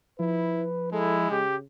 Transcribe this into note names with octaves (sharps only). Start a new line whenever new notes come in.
F3 E4 B4
G#3 E4 A4
C#3 G4